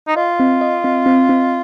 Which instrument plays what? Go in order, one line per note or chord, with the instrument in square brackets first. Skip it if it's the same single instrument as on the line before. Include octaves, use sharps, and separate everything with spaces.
[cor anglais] D#4
[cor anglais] F4 [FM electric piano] D#5
[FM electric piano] C4
D#5
C4
C4
C4